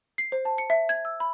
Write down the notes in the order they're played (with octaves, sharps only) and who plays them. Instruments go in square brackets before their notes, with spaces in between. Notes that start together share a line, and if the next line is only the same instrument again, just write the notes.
[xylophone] C7
C5
A5
C#7
E5
G#6
E6
B5